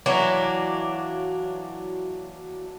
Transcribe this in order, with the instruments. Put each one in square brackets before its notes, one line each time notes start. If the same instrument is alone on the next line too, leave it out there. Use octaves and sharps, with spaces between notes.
[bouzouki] E3 F#3 A#3 D4